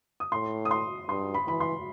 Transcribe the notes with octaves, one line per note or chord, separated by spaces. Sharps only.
D#6
A2 C6
D#6
C6
G2 C6
B5
E3 B5
C6